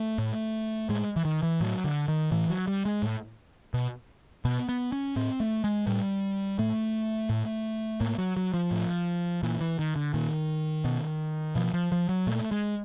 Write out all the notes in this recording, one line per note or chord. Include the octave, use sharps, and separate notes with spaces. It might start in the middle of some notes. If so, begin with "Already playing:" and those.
Already playing: A3
A2
A2 G#3
E3
D#3
E3
A2 F#3
D3
D#3
A2 E3
F#3
G3
G#3
A2
B2
B2 B3
B3
C#4
A2 C4
A3
G#3
A2 G3
A2 A3
A2
A2 A#3
F#3
F#3
F3
A2
A#2 E3
E3
D#3
D3
A#2 D#3
B2
B2 F3
F3
F3
F#3
A#2 A3
G#3